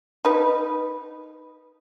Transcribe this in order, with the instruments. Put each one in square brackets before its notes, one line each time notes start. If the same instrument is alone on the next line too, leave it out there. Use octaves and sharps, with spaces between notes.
[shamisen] D#4 B4